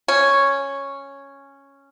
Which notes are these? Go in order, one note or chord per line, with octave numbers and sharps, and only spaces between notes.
C#4